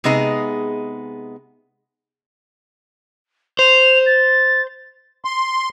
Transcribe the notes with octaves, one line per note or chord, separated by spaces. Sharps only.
C3 G#3 B3 D#4 G#4
C5 F7
A6
C6